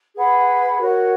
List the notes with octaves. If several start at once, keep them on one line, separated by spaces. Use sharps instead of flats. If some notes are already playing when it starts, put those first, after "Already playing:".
G#4 B4 F#5 B5
F#4 A#4 C#5 F#5